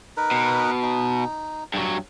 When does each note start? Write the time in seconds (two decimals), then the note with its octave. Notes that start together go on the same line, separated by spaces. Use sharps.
0.17 D#4 A#4 B4
0.31 B2
0.82 D#4
1.74 G2 F#3